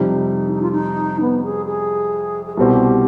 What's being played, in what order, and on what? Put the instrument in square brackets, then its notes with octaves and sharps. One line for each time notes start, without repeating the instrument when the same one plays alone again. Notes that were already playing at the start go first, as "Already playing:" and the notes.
Already playing: [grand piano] F2 C3 G3 [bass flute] D#4
[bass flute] D#4
F4
D#4
B3
G#4
G#4
G#4
[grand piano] C2 B2 G3 C4 [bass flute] G4